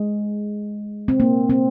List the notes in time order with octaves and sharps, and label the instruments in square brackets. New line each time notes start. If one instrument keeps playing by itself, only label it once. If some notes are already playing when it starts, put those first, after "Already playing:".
Already playing: [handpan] G#3
C4
A#3
C4